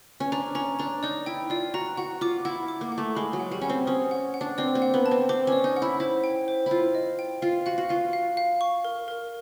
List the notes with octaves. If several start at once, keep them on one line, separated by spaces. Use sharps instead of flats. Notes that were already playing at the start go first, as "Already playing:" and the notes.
C#4
D4 A#5
C#4 A#5
D4 A#5
D#4 D5
E4 G5
F4 D5
F#4 A#5
F#4 F#5
F4 D6
E4 F#5
D6
A#3
F#5
A3
G#3 B5
F#3
F#5
G3
C#4 F#5
C4
C#4 D#6
F#5
F#5
D4
C4 D5
A#3
F#5
B3
A5
C4
C4 D6
C#4 D5
D#4
F#5
E4
E4 C5
G5
C5
E4 F4 C5
D#5
G5
F4 F5
F#4 F5
F#4
F4 F5
F5
F5
C#6
A#4
A#4